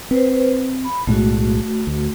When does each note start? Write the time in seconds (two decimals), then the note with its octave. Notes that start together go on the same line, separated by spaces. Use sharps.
0.11 C4 B4 C5
0.85 B5
1.07 B1 A2 G#3 A3 F#4
1.87 D2